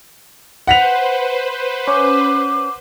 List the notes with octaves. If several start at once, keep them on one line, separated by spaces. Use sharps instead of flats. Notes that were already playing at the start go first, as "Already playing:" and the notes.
B4 C5 F#5 B6 F7
C#4 D6